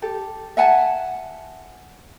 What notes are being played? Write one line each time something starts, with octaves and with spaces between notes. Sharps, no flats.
G4 A4
E5 F#5 G#5 A5